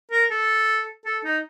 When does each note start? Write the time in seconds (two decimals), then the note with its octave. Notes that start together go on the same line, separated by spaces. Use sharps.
0.11 A#4
0.31 A4
1.05 A4
1.24 D#4